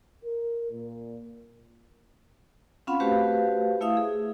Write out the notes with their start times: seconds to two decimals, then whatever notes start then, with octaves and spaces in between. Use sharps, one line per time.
0.24 A#4
0.71 A#2
2.87 C4 C#4 F4 F5 F#5 B5
3.00 A3 F#4 G4 B4 C5 F5
3.81 A3 E4 E5 F5 D#6
3.97 G#4